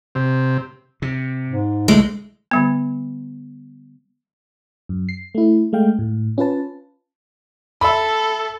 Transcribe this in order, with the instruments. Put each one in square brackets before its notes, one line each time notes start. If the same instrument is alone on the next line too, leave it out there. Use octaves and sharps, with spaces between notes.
[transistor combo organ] C3
[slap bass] C3
[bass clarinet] G#2
[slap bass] B1 D3 E3 [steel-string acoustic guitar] G#3 [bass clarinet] A3
[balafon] D3 G3 B3
[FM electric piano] F#2
C7
A3 E4
G#3 A3 F5 G5
A2
C#4 F4 B4 A5
[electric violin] A4 [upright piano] E5 B5